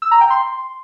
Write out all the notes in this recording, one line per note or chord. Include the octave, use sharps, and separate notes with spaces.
E6
A#5
G5
C6